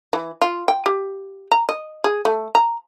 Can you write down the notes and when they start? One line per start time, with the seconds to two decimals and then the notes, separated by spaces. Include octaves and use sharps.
0.13 E3
0.42 F4
0.68 G5
0.86 G4
1.52 A#5
1.69 D#5
2.04 G#4
2.25 A3
2.55 A#5